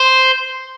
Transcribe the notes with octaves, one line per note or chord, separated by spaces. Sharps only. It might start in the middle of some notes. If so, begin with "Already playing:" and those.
Already playing: C5